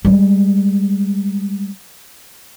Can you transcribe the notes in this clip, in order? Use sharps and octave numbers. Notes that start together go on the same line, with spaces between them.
G3 G#3